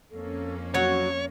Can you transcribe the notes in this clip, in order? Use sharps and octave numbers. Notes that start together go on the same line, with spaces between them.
F2 A#3 C#4 A4
F#3 F#4 C#5